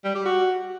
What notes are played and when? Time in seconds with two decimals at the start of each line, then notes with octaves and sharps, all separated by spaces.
0.04 G3
0.15 G4
0.26 F#4